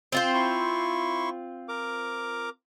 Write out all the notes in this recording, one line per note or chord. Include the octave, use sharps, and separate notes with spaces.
C4 F4 C5
E4 C6 C#6
A#4 D6